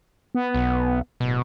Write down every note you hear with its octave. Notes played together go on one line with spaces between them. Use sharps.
B3
B1
D1 B2